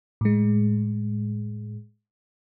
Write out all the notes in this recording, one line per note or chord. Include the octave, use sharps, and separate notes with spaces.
A2 G#3